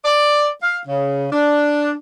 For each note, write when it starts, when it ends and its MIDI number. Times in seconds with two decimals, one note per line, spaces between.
0.05 0.47 74
0.63 0.78 77
0.88 1.26 49
1.32 1.93 62